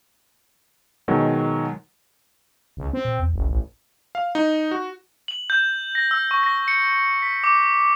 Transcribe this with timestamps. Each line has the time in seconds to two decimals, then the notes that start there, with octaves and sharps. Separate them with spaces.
1.08 B2 D#3 F#3 G#3
2.77 C#2
2.93 C4
3.05 A#2
3.19 E2
3.34 F#1 C2
3.48 A1
4.15 F5
4.35 D#4
4.71 F#4
5.28 F#7
5.50 G6
5.95 A#6
6.11 E6
6.31 C#6
6.43 A#6
6.68 C#7
7.22 B6
7.44 D6